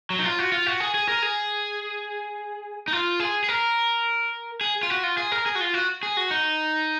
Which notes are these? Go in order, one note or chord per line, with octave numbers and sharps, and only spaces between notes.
F#3
D#4
F4
F#4
F4
F#4
G#4
G#4
A#4
G#4
D#4
F4
G#4
G#4
A#4
G#4
F4
F#4
F4
G#4
A#4
G#4
F#4
F4
F#4
G#4
F#4
D#4